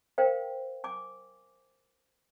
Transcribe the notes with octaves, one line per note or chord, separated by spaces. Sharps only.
A#4 C5 F5 G5
G#5 D6